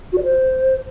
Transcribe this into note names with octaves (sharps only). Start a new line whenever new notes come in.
F#4
D5
C5